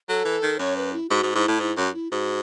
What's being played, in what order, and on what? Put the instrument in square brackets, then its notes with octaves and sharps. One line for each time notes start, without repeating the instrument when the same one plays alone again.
[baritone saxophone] F#3 [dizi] A4
[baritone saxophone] E3
D#3
[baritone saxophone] F#2 [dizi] C#5
[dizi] B4
E4
[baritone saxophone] G#2 [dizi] F#4
[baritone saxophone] G#2
[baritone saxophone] G#2 [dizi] E4
[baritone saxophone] A2
[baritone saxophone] G#2 [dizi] E4
[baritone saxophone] F#2 [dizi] F#4
[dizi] E4
[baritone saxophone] G#2 [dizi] F#4